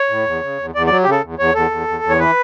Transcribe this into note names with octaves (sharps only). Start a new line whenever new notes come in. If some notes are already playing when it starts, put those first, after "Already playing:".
Already playing: C#5
A2
E2
C#3
E2
E2 D5
F#3 D5
G4
C#3 A4
E2
E2 C#5
E2 A4
E2
E2
E2
C#5
E3 B4